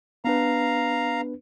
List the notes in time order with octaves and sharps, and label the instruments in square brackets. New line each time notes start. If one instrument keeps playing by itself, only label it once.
[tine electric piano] B3 D4 B4 [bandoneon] F5 A#5